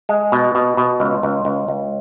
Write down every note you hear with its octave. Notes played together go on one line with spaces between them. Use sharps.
G#3
B2
B2
B2
C#2
C#2
C#2
C#2